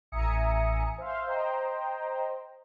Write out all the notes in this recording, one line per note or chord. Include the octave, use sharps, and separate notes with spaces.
A1 E5 G#5 A#5 D#6 C#7
C5 E5 F5 C6
C5 D#5 G5 A#5